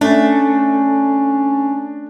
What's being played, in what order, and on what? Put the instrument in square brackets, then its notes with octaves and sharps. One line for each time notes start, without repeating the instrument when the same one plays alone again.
[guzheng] A3 [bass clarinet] C#4 [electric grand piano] D4